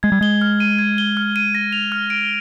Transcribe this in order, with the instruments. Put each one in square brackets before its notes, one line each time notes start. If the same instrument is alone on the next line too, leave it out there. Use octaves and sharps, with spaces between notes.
[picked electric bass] G#3 [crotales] G#6
[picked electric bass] G3
[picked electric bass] G#3 [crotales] G7
[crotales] F6
D#7
G#6
G7
F6
D#7
A#6
F7
F6
D7